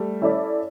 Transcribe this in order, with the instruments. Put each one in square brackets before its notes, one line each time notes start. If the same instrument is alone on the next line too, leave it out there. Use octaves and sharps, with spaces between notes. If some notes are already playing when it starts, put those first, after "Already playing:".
Already playing: [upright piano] G3 A3
[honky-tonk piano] C#4 E4 A4 D5